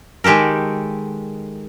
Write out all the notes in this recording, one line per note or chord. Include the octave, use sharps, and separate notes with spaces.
D#3 G#3 G4 A4 A#4